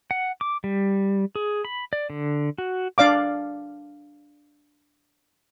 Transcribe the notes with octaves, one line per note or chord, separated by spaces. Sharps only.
F#5
D6
G3
G#4
B5
D5
D3
F#4
D4 D5 F5 D6